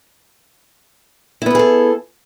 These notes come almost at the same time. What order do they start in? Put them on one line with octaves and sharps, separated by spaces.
E4 B3 B4 G#4 A4